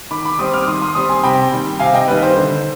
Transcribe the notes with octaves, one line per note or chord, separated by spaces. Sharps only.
D#3 B5 D6
B5 D6
G3 C4 C6 D#6
D6 F6
D#3 C6 D#6
C6 D#6
G3 C4 C6 D#6
G#5 C6
C3 G5 B5
D#3 G3
C3 F5 G#5
D#5 G5
D#3 G3 B4
C5
D3